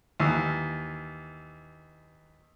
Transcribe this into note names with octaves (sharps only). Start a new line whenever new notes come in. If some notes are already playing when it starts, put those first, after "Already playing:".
D#2 E3